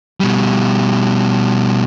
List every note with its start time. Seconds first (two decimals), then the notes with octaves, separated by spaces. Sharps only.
0.20 B2 G3